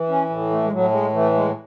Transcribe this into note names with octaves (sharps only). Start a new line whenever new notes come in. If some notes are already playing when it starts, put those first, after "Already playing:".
Already playing: E3
C#4
A2
A3
G#3
A2 F#3
G#3
E3 A3
G#3